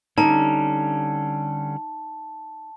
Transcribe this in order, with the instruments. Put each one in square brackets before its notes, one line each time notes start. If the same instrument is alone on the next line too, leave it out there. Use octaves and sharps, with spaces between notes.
[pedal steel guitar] D3 G3 C#4 [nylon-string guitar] D#4 [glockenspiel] A5